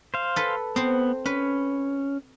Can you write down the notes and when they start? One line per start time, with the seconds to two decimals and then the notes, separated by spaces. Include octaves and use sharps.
0.14 C5 F5
0.36 A4 B4
0.76 B3 C4 C5
1.26 C#4 B4